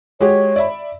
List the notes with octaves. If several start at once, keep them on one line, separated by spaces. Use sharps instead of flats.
G#3 F#4 G4 C#5
D5 E5 B5